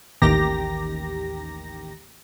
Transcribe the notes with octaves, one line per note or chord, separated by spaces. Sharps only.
A1 D#2 D#3 G4 A#5 A#6